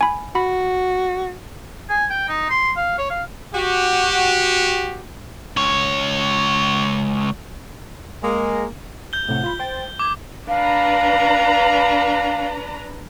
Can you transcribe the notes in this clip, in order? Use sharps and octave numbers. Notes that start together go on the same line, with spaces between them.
G#5 B5
F#4 B5
G#5
G5
D#4
C6
F5
C#5
F5
F#4 G4
C#2 C#5
G#3 A#3
G6 G7
A2 C3 F#5
F4 B5
C5 G5 A6
D6 G#6
D4 B4 F5 A#5